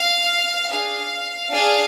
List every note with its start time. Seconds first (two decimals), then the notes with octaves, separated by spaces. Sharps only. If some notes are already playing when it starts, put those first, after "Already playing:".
Already playing: F5
0.70 D4 G#4 F5
1.52 D4 G#4 F5